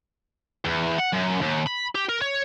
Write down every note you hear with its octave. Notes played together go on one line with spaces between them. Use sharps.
E2
F#5
F#2
D#2
B5
G4
A#4
C#5